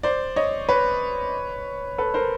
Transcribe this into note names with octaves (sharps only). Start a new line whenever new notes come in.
C5 D5
C#5 D#5
B4 C#5
A4 B4
A#4 C5